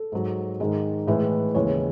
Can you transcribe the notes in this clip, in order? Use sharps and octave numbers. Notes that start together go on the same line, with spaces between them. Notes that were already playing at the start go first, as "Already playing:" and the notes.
Already playing: A4
G#2 F#3
G#2 D#3 G#3
A2 E3 G#3 B4
D#2 C#3 E3 G#3 C#5